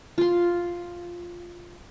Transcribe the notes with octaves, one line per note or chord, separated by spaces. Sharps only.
F4 C6